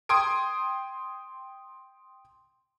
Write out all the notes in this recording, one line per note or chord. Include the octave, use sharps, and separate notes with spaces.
G5 C6 D#6 G#6 D7